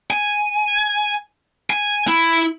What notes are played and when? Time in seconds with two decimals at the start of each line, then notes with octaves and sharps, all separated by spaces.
0.10 G#5
1.70 G#5
2.08 E4